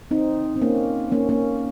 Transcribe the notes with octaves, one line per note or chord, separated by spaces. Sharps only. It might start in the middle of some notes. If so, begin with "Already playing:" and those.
C4 D#4
C4
A#3 C#4
A#3 C#4
A#3 C#4